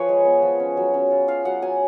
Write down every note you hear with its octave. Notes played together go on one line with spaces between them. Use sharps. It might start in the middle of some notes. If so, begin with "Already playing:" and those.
Already playing: F3 G#4 B4 C#5
G#3
B3
F3
C#4
F#3
C#4
F4
F4 F5
F#3 F#5
F#3 G#5